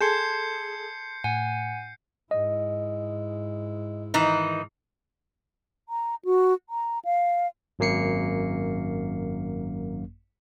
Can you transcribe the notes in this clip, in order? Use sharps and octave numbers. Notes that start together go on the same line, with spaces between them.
G#4 A4 A5 C6 G6 G#6 C7 C#7
A2 F#5 G#5
G#2 E4 D#5
D#3 E3 D#4
A#5
F#4
A#5
F5
G#1 F#2 A#3 C7 C#7